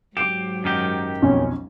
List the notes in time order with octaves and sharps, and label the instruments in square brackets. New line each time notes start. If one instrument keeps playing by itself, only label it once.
[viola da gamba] G#2 F#3 [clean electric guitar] G4 [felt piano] D6 C7 E7
[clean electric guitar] F#2 D#3 G4
[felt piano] B1 F2 [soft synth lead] C#4